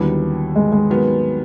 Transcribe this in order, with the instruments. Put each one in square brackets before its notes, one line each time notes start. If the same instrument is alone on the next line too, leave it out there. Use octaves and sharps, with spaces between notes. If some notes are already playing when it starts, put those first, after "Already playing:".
Already playing: [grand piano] D#2 D3 F#3 B3 E4 [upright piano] G3
[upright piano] G#3
G#3
[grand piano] D#3 F#3 B3